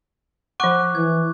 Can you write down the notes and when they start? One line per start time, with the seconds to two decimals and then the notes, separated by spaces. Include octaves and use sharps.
0.60 F3 F#5 C#6 D6 F#6
0.95 E3 G#6